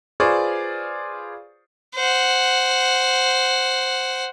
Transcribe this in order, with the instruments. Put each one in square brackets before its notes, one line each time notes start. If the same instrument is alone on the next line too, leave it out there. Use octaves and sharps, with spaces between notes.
[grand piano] F4 G#4 B4 C5 D5 C#6
[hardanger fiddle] C5 F#5